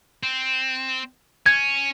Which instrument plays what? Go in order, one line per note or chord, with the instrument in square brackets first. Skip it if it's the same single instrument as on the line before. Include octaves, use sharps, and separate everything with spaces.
[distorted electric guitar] C4
[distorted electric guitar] C#4 [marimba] G#6